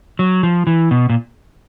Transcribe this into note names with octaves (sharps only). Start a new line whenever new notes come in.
F#3
F3
E3
B2
A#2